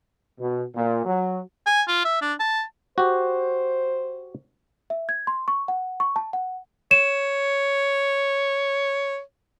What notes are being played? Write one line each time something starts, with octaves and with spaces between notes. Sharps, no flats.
B2
A#2
F#3
G#5
F4
E5
D4
A5
F#4 G4 C5
E5
G#6
C6
C#6
F#5
C#6
A5
F#5
C#5 E7